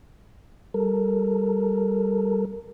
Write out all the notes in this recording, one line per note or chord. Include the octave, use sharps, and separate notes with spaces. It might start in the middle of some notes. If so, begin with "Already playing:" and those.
G3 A4 A#4